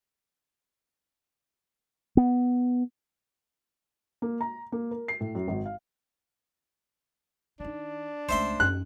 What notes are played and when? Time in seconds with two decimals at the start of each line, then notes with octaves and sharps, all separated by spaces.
2.17 B3
4.22 A#3
4.41 A#5
4.72 A#3
4.91 A#4
5.08 C7
5.20 A2
5.35 F#2
5.48 G#1
5.66 F5
7.60 D#3 D4 D#4
8.29 C#2 A3 C5 E5 C6
8.60 F#2 E3 F#6